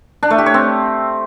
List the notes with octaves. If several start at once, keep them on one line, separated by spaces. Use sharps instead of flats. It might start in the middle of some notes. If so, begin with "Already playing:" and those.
D4
A3
G4
C#5
C4